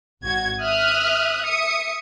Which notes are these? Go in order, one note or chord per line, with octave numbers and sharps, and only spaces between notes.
G#1 F#4 G#6
E5 D#6 F6 F#6
E5 D#6 C#7